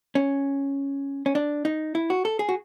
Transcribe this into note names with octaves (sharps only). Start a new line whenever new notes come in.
C#4
C#4
D4
D#4
E4
F#4
A4
G#4
F#4